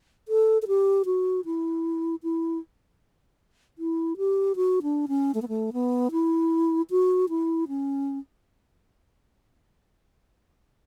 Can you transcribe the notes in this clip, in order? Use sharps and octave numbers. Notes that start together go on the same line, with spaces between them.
A4
A4
G4
F#4
E4
E4
E4
G4
F#4
D4
C#4
A3
B3
A3
B3
E4
F#4
E4
C#4